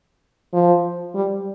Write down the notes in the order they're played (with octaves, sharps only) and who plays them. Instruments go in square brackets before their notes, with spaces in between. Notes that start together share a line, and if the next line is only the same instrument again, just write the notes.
[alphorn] F3
G3